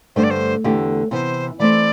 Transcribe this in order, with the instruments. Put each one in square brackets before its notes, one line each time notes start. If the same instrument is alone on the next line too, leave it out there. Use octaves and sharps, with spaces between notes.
[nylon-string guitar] G2 D3 A3 D4 [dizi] C5
[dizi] D5
C5
[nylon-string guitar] E2 D3 A3 E4 G4
[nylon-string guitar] C3 E3 B3 [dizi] C5
[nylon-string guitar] E3 A3 C4 [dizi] D5